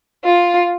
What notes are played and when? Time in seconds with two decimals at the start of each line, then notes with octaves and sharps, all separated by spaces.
0.24 F4